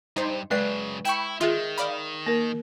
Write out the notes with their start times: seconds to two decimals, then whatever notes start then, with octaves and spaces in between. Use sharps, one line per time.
0.16 G2 D#4 C5
0.51 F#2 C#3 G#3 B4 D5 C7
1.05 E4 G5 B5 C#6
1.41 D#3 F4 G#4 E5
1.78 D5 F5 B5
2.26 A#3 A#4